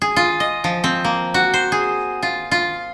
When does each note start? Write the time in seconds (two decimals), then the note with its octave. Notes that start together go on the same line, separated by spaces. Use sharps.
0.02 G#4
0.16 F4
0.40 D#5
0.64 F3
0.84 C4
1.04 A#3
1.34 F#4
1.54 C5
1.72 G#4
2.23 F4
2.51 F4